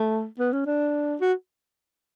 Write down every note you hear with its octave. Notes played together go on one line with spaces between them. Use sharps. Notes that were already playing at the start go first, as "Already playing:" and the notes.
Already playing: A3
B3
C#4
D4
F#4